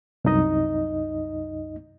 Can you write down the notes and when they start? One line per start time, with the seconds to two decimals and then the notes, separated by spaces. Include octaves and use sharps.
0.25 C2 F#2 D#4 D#5